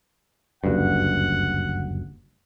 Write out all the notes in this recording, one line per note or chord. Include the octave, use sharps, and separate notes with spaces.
F#1 D2 G2 F#5